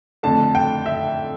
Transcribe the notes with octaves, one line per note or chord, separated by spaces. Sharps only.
F2 D3 A3 A5
G5
E5